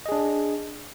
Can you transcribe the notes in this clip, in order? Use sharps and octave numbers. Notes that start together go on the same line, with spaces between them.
D4 G#4 D#5